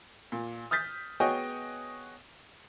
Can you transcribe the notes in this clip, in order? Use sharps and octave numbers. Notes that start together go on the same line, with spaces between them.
A#2
D#6 F6 G6 A6 B6
B3 F#4 G#4 C#5 D#5 G5